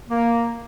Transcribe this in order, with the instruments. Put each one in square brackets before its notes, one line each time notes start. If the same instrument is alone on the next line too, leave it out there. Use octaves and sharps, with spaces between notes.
[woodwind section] A#3